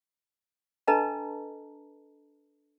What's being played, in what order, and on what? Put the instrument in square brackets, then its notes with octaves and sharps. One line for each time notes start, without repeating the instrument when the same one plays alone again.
[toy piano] D4 A4 B4 D#5 A5 A#5